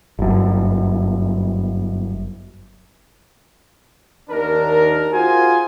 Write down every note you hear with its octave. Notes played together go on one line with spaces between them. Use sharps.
G1 F#2
D#2 D#3 D4 A#4
F4 F#4 G#4 C5 G#5